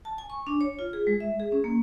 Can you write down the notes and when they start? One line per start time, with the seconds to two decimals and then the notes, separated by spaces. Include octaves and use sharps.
0.05 A5
0.18 G#5
0.30 C#6
0.47 D4
0.61 C#5
0.79 F4
0.93 G#4
1.07 G#3
1.20 E5
1.40 G#4
1.52 C#4
1.64 A#3